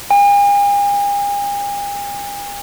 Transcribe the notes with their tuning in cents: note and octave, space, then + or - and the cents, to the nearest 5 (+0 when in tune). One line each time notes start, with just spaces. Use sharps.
G#5 -45